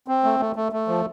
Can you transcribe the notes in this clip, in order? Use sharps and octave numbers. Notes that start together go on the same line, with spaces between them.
C4
A3
A3
A3
A3
F3